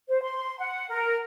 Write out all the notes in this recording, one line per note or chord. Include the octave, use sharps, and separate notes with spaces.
C5
C6
F#5
A#4